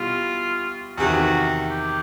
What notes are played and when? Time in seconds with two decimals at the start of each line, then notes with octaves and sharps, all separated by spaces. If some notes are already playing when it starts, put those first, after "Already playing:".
Already playing: B2 G3 B3 E4 F4
0.97 E2 C3 D#3 F#4
1.71 G4